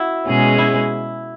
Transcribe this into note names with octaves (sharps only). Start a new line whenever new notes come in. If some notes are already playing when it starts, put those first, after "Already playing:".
Already playing: E4 F#4
B2 G#3 C#4 G#4
E4